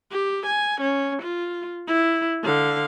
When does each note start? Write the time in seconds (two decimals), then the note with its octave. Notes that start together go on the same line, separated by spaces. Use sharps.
0.11 G4
0.46 G#5
0.81 C#4
1.22 F4
1.87 E4
2.43 D3 F5